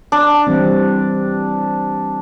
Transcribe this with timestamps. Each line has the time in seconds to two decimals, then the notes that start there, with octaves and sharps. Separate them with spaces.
0.12 D4
0.47 E3 G3 C4